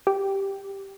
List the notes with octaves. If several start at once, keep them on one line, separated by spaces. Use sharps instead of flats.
G4